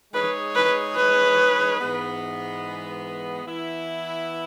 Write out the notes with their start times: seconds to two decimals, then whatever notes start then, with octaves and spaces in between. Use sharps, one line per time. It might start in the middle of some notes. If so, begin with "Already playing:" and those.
0.13 G#3 D#4 G#4 B4 C#5
0.55 B4
0.96 B4
1.79 G#2 E3 G#3 B3
3.45 E3 B3 E4